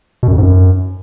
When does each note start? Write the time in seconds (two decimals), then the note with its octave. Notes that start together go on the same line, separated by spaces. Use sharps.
0.23 B2
0.28 F#2
0.33 F2
0.38 G#2
0.43 F#2